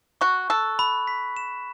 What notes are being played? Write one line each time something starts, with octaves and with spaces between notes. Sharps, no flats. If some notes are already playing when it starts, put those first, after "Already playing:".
F#4 C#6
A4 F#6
B5
B6
E7